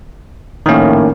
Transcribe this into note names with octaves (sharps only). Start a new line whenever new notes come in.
A#1 A2 D#3 A#3 C#4